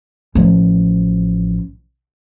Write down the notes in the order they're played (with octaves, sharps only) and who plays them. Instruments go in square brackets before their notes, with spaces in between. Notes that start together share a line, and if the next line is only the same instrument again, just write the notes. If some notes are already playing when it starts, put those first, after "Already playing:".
[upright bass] A1 F3